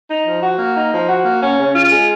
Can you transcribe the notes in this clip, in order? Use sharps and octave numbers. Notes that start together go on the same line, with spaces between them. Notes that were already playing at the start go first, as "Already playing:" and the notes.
D#4
F3
F#4
A#3
D#4
F3
F#4
A#3
C#4
C#3
F4
G#3